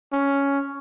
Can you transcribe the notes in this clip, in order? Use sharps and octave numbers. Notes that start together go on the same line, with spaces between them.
C#4